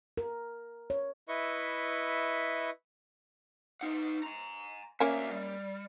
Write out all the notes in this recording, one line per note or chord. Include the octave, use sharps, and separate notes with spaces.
A#4
C#5
E4 B4 D#5 E5 C#6
D#4 F#5
G#5 A#5
D2 A#3 C#4 E5
G3